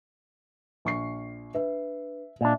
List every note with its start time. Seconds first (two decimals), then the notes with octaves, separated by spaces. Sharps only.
0.85 A#1 C#6 C7
1.55 D4 B4 E5
2.41 A#2 D4 D#5 E5